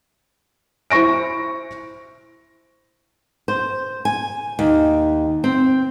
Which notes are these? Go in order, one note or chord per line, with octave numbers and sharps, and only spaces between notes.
E4 C5 C#6 A#6 D7
C5
G#5
D#2
C4